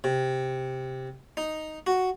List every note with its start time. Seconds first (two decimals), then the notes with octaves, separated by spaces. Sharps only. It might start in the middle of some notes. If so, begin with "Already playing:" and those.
0.04 C3
1.37 D#4
1.87 F#4